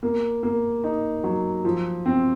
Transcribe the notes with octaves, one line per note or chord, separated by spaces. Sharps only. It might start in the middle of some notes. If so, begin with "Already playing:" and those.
A#3
A#3
D#4
F#3
F3
C4